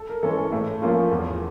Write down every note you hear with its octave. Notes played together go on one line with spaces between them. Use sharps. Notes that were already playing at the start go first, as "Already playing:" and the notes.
Already playing: A4
A#4
E3 G#3 C#4 A4
A2 A4
F3 A#3 C#4 F4
E2